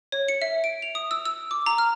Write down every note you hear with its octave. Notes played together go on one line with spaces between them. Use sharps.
C#5
C#7
E5
D7
F7
D#6
E6
E6
D6
A#5
F6